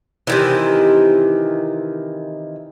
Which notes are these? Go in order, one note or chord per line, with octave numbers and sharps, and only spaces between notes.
C3 D#3 E3